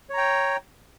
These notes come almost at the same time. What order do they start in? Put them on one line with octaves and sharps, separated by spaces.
C#5 A#5 G5